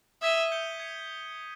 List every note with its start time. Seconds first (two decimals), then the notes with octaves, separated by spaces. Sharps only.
0.22 E5 D#6 G#6 B6 D#7 G7
0.52 G6 C#7 G7
0.80 G#6 C#7